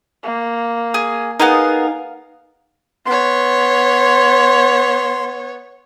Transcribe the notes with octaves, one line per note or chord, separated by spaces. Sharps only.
A#3
G#4
B3 D#4 G#4 A#4 F5
B3 C#5 C6